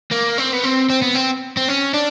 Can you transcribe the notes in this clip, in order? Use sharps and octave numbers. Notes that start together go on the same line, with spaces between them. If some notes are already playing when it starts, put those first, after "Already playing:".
A#3
C4
B3
C4
C4
B3
C4
C4
C#4
D4